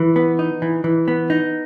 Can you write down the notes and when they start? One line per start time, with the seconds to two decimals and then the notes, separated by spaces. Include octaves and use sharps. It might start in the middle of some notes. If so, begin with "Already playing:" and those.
Already playing: E3
0.16 B3
0.39 D#4
0.62 E3
0.84 E3
1.08 B3
1.30 D#4